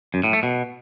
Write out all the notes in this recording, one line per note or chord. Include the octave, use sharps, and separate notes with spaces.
F#2
A2
A3
B2